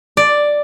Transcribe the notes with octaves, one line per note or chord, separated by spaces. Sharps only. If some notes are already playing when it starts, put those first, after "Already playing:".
D5